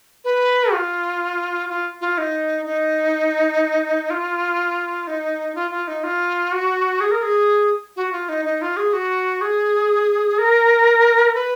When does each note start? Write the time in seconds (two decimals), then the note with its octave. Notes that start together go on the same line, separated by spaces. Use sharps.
0.24 B4
0.73 F4
1.69 F4
2.01 F4
2.18 D#4
2.66 D#4
4.10 F4
5.07 D#4
5.55 F4
5.71 F4
5.88 D#4
6.04 F4
6.52 F#4
7.01 G#4
7.11 A#4
7.23 G#4
7.96 F#4
8.12 F4
8.29 D#4
8.45 D#4
8.62 F4
8.77 G#4
8.93 F#4
9.41 G#4
10.38 A#4
11.35 B4